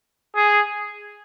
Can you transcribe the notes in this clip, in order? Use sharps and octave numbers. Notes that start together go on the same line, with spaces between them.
G#4